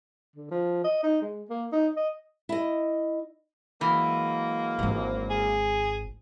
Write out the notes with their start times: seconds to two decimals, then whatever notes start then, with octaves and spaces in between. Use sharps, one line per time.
0.36 D3
0.51 F3
0.84 D#5
1.03 D#4
1.21 G#3
1.49 A#3
1.72 D#4
1.96 D#5
2.49 E4 D#5
3.81 E3 F#3 G#3 A#3
4.79 G#1 G#2
5.30 G#4